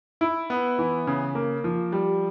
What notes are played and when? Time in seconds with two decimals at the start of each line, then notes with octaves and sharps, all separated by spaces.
0.21 E4
0.50 B3
0.78 E3
1.07 C#3
1.35 A#3
1.64 F3
1.92 G3